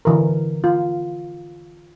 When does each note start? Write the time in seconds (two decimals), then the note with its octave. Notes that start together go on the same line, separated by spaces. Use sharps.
0.05 D3 E3 A#4
0.64 F4